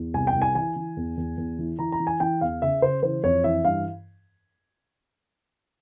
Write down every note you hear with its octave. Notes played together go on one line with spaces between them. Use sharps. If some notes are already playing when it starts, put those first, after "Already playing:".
Already playing: E2
C2 G#5
G5
C2
G#5
E3 G#5
E3
E2
E2
E2
E3
E3 A#5
A#5
E3
G#5
E3 G5
E2 F5
C#3 E5
C#3 C5
E3 C5
F2 C#5
E3 E5
G2 F5